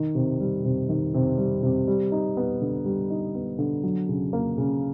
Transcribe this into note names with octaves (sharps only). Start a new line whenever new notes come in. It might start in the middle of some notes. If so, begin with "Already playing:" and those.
Already playing: D#3
C3
G3
C3
D#3
C3
G3
C3
G3
D#4
B3
D3
G3
D#4
B3
D3
F#3
C#3
A#3
C#3